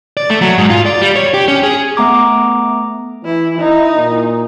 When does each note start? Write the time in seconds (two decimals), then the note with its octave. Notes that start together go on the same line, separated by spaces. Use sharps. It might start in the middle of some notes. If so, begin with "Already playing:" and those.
0.17 D5
0.30 A3
0.41 F#3
0.58 G#2
0.70 F4
0.86 D5
1.01 G3
1.16 C#5
1.34 G4
1.48 C#4
1.63 G#4
1.97 A3 B3 A#5 D6
3.25 E3 E4
3.58 D#4 E4
3.96 A#2